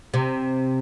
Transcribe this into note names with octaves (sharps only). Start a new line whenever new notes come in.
C3